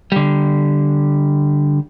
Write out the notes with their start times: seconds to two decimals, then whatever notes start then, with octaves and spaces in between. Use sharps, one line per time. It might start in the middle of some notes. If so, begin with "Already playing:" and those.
0.12 D3 G3